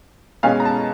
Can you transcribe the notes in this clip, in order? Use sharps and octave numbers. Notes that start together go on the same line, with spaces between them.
B2 G#3 C#4 F5
A#5
A5